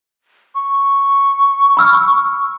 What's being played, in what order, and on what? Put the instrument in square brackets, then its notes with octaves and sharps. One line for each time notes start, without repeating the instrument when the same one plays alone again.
[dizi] C#6
[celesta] B5 E6 F6